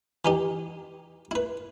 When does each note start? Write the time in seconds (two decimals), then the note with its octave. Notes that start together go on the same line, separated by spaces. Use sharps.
0.25 E3 D#4 G4
1.31 E4 B4